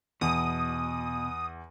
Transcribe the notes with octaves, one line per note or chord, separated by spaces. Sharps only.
E2 B2 D#6